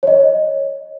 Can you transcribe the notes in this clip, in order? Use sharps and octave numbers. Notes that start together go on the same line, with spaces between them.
C#5 D#5